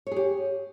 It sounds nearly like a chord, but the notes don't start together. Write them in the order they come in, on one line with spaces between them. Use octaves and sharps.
C#5 G#4 G4